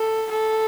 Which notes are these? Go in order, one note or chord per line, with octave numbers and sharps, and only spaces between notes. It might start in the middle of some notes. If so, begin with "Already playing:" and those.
Already playing: A4
A4